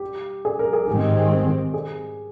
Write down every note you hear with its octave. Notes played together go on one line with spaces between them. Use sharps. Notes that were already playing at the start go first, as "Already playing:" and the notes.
Already playing: G4
G#4
A#4
G#4
G#2 D#3 G#3 C4 G4
G#4